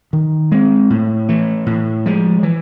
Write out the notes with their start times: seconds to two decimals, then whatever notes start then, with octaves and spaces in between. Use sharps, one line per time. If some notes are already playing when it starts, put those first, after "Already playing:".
0.13 D#3
0.52 G#3 C4
0.90 A2
1.29 E3 A3
1.66 A2
2.06 F3 G#3
2.43 E3